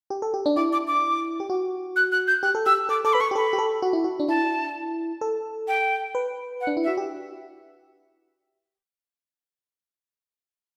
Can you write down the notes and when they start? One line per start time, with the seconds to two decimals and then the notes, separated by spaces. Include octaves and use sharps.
0.10 G4
0.22 A4
0.34 G4
0.46 D4
0.56 E4 D6
0.73 D6
0.88 D6
1.40 G4
1.50 F#4
1.96 F#6
2.12 F#6
2.28 G6
2.43 G4 F#6
2.55 A4
2.66 G4 E6
2.89 A4 D6
3.05 A4 D6
3.13 B4 B5
3.20 A4 C#6
3.31 G4
3.35 A4 B5
3.53 G4
3.58 A4
3.82 F#4
3.93 E4
4.04 F#4
4.20 D4
4.29 E4 A5
5.21 A4
5.68 G5
6.15 B4
6.61 F#5
6.67 D4
6.77 E4
6.84 E5
6.87 F#4
6.97 G4